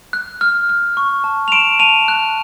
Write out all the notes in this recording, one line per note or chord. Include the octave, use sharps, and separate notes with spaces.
F#6
F6
F6
C#6
A5
F7
C6 D7 E7
A5 D#7 F7
F#6